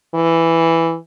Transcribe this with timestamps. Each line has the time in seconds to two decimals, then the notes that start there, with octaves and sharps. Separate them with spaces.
0.14 E3